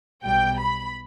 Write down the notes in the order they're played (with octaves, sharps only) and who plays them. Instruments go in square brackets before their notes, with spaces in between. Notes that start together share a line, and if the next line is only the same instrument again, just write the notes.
[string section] B1 B2 G3 G5
B5